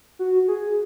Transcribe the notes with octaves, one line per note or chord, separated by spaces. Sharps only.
F#4
G#4